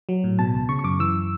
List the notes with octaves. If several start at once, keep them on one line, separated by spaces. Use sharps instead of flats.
F#3
A2
B2 A5
C#2
C#3 C#6
C#6
F#2 D6
E3 E6